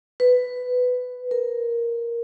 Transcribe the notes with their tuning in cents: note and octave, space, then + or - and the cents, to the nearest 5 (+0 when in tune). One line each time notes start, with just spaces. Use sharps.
B4 +10
A#4 +5